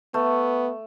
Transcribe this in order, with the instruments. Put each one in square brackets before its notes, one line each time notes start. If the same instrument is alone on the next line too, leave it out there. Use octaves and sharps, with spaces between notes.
[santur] A3 [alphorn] B3